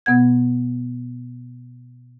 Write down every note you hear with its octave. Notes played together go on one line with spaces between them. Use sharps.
B2 B3 F#5 G#6